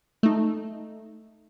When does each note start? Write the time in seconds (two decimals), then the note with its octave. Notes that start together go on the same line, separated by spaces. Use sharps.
0.23 A3 D#4